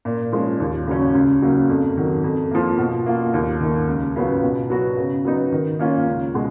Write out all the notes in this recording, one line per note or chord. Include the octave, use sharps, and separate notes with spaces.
A#2
F3 G#3 C#4
D#2
C#3 F#3 C#4
C#2
C#3 F#3 A#3
F2
D#3 F#3
F2
F3 A#3
B2
A#3 F4
D#2
D#3 A#3
C#2
C#3 F#3 B3 F4
B2
F#3 B3 F#4
C#3
F#3 B3 D#4
D#3
A#3 C#4 F4
C#2
B2 G#3